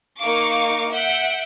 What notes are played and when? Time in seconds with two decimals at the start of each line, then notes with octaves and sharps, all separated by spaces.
0.20 A#3 D#4 F5 C#6 D6
0.93 E5 F#5 G6 D7